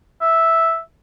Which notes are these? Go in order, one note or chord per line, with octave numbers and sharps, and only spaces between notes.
E5